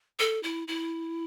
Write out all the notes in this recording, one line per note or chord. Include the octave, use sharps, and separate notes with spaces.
A4
E4
E4